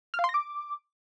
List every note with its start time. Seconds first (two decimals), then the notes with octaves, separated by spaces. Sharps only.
0.14 F6
0.19 F5
0.24 C6
0.29 A#6
0.34 D6